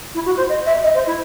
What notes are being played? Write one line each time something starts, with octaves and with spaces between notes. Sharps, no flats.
E4
F#4
C5
D#5
E5
D#5
C5
E4